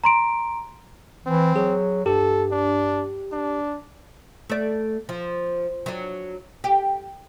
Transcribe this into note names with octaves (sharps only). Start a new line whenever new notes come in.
A#5 C6 D7
E3 C4
F#3 G#4
G2 G4 A4
D4
D4
A3 D5
F3
F#3 D4
G4